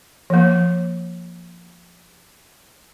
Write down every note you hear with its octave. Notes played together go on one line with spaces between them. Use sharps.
F3 A#3